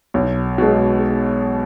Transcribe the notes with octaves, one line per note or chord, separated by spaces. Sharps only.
B1
B2 G#3